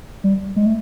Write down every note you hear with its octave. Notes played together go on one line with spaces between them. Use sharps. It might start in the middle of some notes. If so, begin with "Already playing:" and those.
G3
G#3
A3